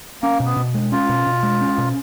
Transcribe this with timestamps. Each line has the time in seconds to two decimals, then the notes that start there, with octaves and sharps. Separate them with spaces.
0.22 A#3 C#4
0.40 B2
0.46 B3
0.56 B2
0.74 G#3
0.92 C#4 F4
1.09 B2
1.27 B2
1.43 G#3
1.61 C#4
1.78 B2